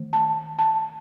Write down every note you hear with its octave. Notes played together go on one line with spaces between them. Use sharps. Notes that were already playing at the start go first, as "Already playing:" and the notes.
Already playing: D#3 A3
A5
A5